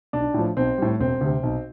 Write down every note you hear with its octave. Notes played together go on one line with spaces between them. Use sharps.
B1 D4
A2 F3
B1 C4
A2 G3
E1 C4
D2 C3
B1